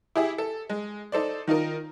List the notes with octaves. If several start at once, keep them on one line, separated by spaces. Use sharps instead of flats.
E4 G4 G#4 E5
A4
G#3
D#4 A4 C5 D5
D#3 D#4 F4 A#4